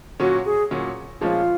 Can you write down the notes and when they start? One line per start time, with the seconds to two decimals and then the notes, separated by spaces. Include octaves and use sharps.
0.20 A#2 F#3 C#4 F#4
0.45 G#4
0.71 A#2 F#3 C#4
1.21 A#2 F3 G#3 C#4 F4